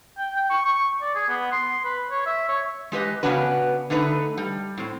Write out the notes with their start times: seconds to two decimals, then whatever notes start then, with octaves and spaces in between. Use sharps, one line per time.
0.18 G5
0.36 G5
0.50 C#6
0.65 C#6
1.01 D5
1.15 G#4
1.29 B3
1.52 C6
1.85 B4
2.11 C#5
2.26 E5
2.49 C#5
2.92 G#3 G4 B4 D#5
3.23 C#3 B3 C#4 D4 F#4 B4
3.90 D3 A3 D#4 B4
4.38 G3
4.78 A2 C4